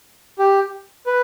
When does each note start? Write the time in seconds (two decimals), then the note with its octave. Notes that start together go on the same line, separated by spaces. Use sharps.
0.39 G4
1.06 B4